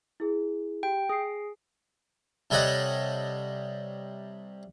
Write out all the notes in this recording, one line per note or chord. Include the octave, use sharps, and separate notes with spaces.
E4 G#4
G4 G5
G#4 D#6 C7
C3 G3 A4 C#5 D#5 F#5